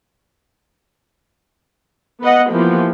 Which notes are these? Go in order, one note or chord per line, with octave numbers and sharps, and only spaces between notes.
B3 B4 D#5 F#5
E3 F3 A#3 B3 G4